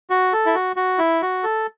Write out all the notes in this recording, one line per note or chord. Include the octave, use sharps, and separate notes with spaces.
F#4
A4
E4
F#4
F#4
E4
F#4
A4